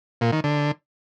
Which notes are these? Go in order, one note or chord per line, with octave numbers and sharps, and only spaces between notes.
A#2
D#3
D3